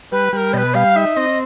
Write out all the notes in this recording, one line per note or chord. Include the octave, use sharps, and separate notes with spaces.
G3 B4
G3 A#4 B4
B2 B4 D#5
G3 F5
D#4 E5
C4 D#5